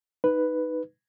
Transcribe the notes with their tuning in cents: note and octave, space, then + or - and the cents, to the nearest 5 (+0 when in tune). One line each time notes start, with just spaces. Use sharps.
D#4 +0 B4 +0